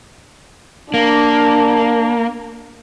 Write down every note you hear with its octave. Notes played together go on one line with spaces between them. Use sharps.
A#3 D4